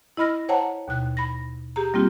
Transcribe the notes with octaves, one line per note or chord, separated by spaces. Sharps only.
E4 D#5 B5 F6 A#6
C5 C#5 F#5 G5 A5 A#5
D#2 B2 F#6
B5 A#6
G4 G#4 A#5
G3 A#3 C4 F4 G4